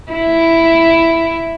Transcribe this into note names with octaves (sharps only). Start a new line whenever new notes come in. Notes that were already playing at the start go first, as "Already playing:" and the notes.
E4